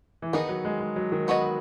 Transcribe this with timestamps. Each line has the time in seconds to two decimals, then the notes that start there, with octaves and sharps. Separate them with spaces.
0.22 E3
0.33 D#3 B3 D#4 G#4 D#5
0.49 F#3
0.65 G#3
0.80 G#3
0.96 F#3
1.12 D#3
1.28 B3 F#4 B4 D#5